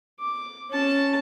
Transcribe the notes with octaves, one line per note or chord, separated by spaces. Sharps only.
D6
C#4 A5